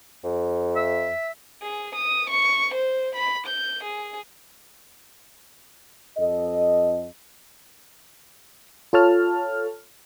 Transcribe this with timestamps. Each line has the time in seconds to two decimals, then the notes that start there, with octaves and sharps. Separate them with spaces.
0.24 F2
0.76 E5
1.63 G#4
1.95 D#6
2.30 C#6
2.74 C5
3.15 B5
3.47 G6
3.83 G#4
6.18 F2 A4 D#5
8.93 F4 A4 C#5 A5 F6